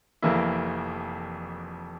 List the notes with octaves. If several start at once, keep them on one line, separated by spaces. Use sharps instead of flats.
F1 F2 E3 A#3 E4